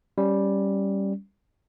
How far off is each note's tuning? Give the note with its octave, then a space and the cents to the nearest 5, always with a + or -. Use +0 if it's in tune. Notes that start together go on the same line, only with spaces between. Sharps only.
G3 +0 C#4 +0